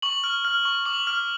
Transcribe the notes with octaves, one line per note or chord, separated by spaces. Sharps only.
C#6 F#7
F6
F6
C#6
D6 F#7
F6